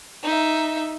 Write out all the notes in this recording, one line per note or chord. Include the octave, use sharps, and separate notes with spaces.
D#4 E5